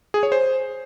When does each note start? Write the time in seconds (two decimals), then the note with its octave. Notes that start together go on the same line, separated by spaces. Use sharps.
0.14 G#4
0.23 C#5
0.32 C5